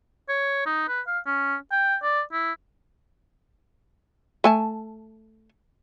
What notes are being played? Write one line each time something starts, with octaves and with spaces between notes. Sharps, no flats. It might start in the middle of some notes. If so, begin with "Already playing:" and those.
C#5
D#4
B4
F5
C#4
G5
D5
E4
A3 G#5 A5